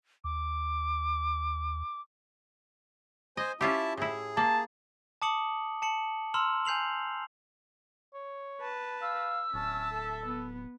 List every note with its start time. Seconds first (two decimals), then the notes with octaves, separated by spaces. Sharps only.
0.24 D#2 D6
3.37 C5 D#5 G#5
3.61 C#4 E4 F4 G4 E5 A5
3.97 A2 E4 G#4
4.37 A#3 A5
5.22 A5 D6 D#6 C#7 F#7
5.82 A5 C#7 F#7
6.34 A#5 C6 E6 F6 E7 F#7
6.65 G#5 G6 C7 F7 F#7
8.14 C#5
8.61 B4 A5
9.02 F5 E6
9.54 D1 C#4 E5 A5
9.91 A4
10.26 B3